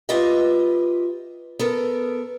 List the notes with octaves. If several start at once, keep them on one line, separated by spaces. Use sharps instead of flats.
F4 G4 B4 D#5 E5
B3 A4 A#4